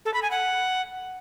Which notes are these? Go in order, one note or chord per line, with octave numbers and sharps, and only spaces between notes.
A4
B5
G#5
F#5